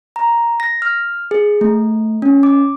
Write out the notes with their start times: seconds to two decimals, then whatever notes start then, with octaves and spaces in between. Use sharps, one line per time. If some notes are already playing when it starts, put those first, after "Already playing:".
0.16 A#5
0.60 A#6
0.82 F6
1.31 G#4
1.61 A3
2.22 C#4
2.43 D6